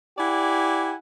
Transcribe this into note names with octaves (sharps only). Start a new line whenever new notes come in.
E4 G4 D5 F#5 G#5